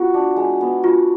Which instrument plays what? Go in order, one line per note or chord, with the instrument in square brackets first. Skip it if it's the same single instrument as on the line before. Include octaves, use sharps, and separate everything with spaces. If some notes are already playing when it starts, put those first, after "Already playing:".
Already playing: [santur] B3 F#4 [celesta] F4
[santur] D4
G#3
B3
[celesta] F4 [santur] F#4